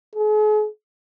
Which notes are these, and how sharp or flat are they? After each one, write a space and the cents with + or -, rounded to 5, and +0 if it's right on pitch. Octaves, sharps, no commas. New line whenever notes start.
G#4 +40